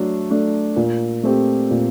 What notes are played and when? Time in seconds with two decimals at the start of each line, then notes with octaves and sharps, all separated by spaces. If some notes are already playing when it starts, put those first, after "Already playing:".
Already playing: F#3 A3 D4
0.30 A3 D4
0.76 A#2
1.23 A3 C4 G4
1.71 A#2